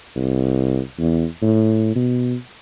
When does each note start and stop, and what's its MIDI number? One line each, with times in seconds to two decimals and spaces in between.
0.16 0.80 36
0.99 1.26 40
1.42 1.94 45
1.95 2.35 47